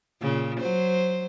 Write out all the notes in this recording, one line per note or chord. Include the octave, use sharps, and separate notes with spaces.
A#2 C#3
F#3 C5